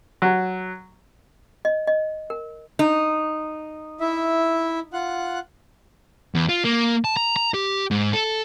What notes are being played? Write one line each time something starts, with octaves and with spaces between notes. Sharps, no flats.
F#3
D#5
D#5
A#4
D#4
E4 E5
F4 F#5 F#6
E2
F4
A#3
A5
A#5
A#5
G4
G#2
A4